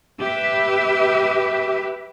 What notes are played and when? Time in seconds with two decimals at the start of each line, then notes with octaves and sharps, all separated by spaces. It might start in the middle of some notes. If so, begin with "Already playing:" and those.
0.21 G4 B4 E5